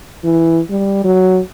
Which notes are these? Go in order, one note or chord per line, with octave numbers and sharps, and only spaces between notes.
E3
G3
F#3